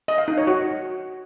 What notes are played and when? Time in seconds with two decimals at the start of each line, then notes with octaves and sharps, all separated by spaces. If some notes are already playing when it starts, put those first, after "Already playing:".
0.08 D#5
0.18 F5
0.28 D#4
0.38 C#5
0.47 F#4